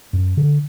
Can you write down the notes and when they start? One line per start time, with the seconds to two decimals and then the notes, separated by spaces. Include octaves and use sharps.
0.13 F#2
0.37 D3